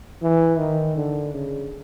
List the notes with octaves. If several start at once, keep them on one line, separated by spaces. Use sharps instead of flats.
E3
D#3
D3
C#3